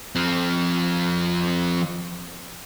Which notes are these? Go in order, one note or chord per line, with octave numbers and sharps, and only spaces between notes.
F3 C4